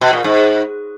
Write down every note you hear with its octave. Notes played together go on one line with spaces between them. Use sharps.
B2
A#2
G#2